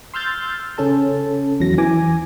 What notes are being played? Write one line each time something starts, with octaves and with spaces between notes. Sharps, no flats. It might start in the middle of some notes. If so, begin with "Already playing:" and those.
C6 E6 F6 G6 A6
C#3 C#4 A4 A5
E2 F#3 A#6
E3 G#5 D6